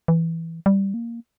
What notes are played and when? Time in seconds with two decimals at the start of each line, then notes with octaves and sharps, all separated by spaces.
0.08 E3
0.66 G3
0.94 A#3